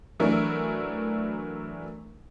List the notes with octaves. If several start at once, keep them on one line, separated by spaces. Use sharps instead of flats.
E3 F#3 A3 D4 E4 A#4